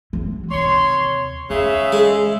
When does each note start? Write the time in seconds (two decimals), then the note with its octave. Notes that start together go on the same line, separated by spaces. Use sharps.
0.13 E3 F#3
0.51 D#2 C3 C#5 C6
1.50 E2 C#3 G#4 E5
1.93 G#3